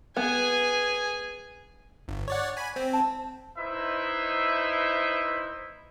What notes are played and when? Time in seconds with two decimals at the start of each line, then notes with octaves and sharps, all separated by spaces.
0.17 B3 G#4 G#5
2.08 G1
2.28 C#5 D5 F#5
2.57 G#5 B5
2.76 C4
2.93 A5
3.58 D#4 E4 B4 C5 D#5 E5